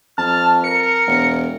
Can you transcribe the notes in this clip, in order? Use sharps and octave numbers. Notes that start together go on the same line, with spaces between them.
F2 A5 F6
A#4 C#7
E1